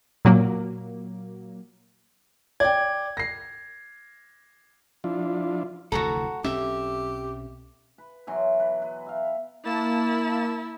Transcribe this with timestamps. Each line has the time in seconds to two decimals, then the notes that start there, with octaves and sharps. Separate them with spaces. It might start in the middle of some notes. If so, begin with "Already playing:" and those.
0.25 A#2 F#3 A#3
2.60 D5 G5 G#6
3.17 A#6 C7
5.04 F3 D4 E4 F4
5.92 F1 D2 E3 F#4 G#4 A4 A#5
6.44 B1 C4 C#4 G4 E5
7.98 B4
8.27 B2 E3 F#3 C6
8.60 B4
8.82 B4
9.07 E5 F5
9.65 A#3 E4 A5 E7